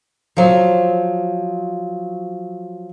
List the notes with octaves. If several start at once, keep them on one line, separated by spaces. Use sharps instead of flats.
F3 F#3